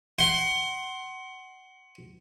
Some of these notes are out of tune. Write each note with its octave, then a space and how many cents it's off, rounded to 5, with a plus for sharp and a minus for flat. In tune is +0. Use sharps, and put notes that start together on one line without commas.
F#5 +25 C6 +15